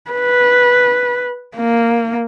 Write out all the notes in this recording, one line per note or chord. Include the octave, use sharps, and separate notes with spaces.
B4
A#3